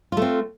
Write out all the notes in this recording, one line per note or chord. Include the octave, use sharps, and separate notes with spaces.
A3 C4 F4